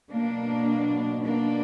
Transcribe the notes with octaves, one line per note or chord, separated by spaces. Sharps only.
B2 F#3 A#3 D4
A#3 D4